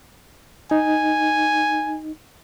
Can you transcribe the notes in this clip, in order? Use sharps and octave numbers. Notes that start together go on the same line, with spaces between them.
D#4 G#5